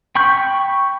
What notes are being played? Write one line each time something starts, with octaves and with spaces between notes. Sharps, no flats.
G5 B5 C#6 G6